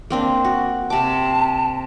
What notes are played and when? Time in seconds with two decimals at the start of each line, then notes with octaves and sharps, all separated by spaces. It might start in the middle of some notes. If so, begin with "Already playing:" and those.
0.10 A#3 C4 D4
0.45 F#4
0.90 C3 A5 D6